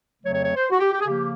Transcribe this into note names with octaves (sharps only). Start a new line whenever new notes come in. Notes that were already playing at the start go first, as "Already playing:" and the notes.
F2 C#3 F#3 A3 C#5
C#5
C#5
C5
F#4
G4
G4
G#4
C#3 F3 A#3 G4